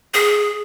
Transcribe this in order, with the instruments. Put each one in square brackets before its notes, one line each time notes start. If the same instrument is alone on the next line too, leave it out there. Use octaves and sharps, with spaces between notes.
[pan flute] G#4